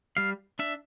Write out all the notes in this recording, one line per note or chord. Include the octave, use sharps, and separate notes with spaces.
G3 F5
D4 E5